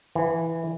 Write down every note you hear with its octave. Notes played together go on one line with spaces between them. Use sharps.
E3